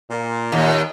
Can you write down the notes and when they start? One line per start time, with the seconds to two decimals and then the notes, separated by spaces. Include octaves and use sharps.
0.10 A#2
0.52 D#2